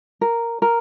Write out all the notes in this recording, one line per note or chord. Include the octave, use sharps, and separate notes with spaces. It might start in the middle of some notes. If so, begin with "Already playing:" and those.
A#4
A#4